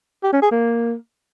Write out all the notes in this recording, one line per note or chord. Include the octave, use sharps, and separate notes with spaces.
G4
C#4
G#4
A#3